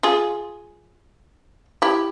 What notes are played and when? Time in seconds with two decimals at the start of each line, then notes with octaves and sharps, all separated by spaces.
0.03 F4 G#4
1.82 E4 G4